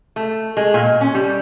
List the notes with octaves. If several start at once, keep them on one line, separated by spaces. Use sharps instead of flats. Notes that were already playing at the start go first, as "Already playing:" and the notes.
A3
G#3
A#2
C#4
G3